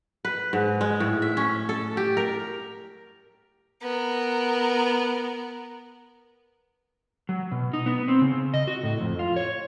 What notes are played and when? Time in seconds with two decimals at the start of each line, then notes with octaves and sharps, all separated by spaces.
0.25 B4
0.53 G#2
0.81 G#3
1.00 A2
1.22 E5
1.37 C#4
1.69 A4
1.97 G4
2.17 A#4
3.82 B3 A#4
7.29 F#3
7.52 B2
7.73 D#4
7.86 B3
8.08 C4
8.21 C#3
8.54 D#5
8.67 F#4
8.83 A2
9.01 F2
9.19 F4
9.36 C#5